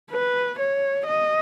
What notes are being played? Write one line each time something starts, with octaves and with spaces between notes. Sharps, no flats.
B4
C#5
D#5